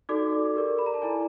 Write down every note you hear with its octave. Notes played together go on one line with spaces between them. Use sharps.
D#4 F#4 A4 D5 D6
G4 A#4 D5
B5
A#5
A5
E4 A4 D5 G#5